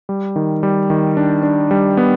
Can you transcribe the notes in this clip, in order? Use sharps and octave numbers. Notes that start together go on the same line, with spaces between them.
G3
D#3
G3
D#3
D4
D4
G3
B3